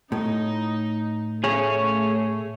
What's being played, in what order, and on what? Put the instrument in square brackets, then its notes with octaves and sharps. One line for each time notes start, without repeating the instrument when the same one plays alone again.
[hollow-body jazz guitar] A2 [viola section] D#4
[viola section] A3 [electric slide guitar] G#4 C#5